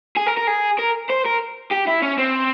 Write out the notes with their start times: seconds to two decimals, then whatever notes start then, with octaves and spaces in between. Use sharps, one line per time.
0.17 G#4
0.27 A#4
0.37 A#4
0.47 G#4
0.79 A#4
1.10 C5
1.26 A#4
1.72 G4
1.88 E4
2.03 C#4
2.18 C4